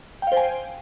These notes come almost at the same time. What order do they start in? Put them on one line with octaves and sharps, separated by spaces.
G5 F5 C5 G#5